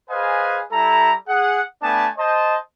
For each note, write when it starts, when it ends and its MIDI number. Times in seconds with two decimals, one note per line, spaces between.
0.10 0.62 68
0.10 0.62 71
0.10 0.62 72
0.10 0.62 75
0.10 0.62 77
0.10 0.62 80
0.71 1.12 55
0.71 1.12 64
0.71 1.12 69
0.71 1.12 82
1.28 1.61 68
1.28 1.61 78
1.82 2.07 57
1.82 2.07 59
1.82 2.07 62
1.82 2.07 80
1.82 2.07 81
2.18 2.56 72
2.18 2.56 75
2.18 2.56 81